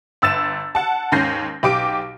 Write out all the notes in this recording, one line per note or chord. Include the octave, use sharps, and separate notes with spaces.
G1 E6 A6 E7
F#5 A5
D#2 G#2 C#4 G6 A#6 C7
B1 G4 D6 D7